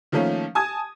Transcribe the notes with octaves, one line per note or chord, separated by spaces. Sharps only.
D#3 F3 A3 A#3 C#4
G#5 A5 D#6 G#6